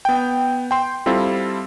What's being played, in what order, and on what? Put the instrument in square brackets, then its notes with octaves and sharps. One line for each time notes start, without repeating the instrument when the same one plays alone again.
[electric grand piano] B3 G5
G5 C6
G3 C4 E4 F4 A4